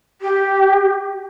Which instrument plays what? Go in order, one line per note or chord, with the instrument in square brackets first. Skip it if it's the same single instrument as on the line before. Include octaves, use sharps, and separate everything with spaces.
[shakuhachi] G4